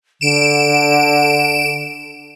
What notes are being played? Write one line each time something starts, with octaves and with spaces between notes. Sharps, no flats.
D3 D7 E7